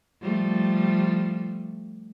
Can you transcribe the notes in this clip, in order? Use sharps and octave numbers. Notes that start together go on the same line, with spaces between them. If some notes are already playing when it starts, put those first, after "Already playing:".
F3 G3 A3